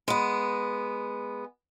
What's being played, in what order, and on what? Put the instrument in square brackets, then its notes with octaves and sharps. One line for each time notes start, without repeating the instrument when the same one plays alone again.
[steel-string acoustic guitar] G#3 B3